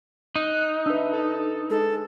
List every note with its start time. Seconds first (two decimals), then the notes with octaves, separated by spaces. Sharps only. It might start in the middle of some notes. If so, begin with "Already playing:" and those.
0.36 D#4 F#6
0.86 D4 B4 E5
1.13 A4
1.70 G#3 A4